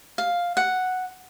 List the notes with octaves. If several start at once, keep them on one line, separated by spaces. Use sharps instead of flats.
F5
F#5